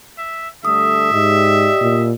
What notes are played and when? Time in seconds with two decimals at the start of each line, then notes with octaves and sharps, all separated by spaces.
0.18 E5
0.65 D3 G3 A3 E5 D#6
1.13 G#2 G4 D5 D#5
1.81 A#2